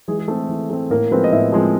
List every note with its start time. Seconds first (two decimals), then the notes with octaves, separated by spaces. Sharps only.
0.08 E3 G#3 G#4
0.19 G#4
0.28 A3 C4 A4
0.49 E3
0.70 A3 C4
0.90 A2 A#3 A#4
1.11 F3 G#3 B3 C4 B4
1.24 D#5
1.32 A2 E4 E5
1.52 F3 G#3 C4